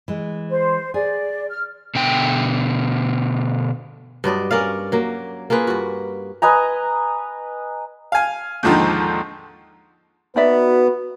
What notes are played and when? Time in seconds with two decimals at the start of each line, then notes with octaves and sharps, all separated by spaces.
0.08 E3 G#3
0.50 C5
0.94 G#4 D5
1.49 F6
1.95 B2 D3 G5
4.24 G2 F#3 D5 D#5
4.51 C#4 A#4 D5 F5
4.92 F#3 A#3
5.50 A#3 F4 G#4 B4
5.67 G2 F#4
6.42 B4 D#5 G#5 A#5
8.12 F5 G#5
8.63 D#2 G#2 D3 D#3 F3
10.36 B3 D#4 F#4 B4 D5 E5